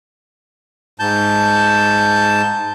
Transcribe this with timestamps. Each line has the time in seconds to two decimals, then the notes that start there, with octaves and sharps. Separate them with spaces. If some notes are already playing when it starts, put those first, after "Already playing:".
1.00 G#2 A5 G6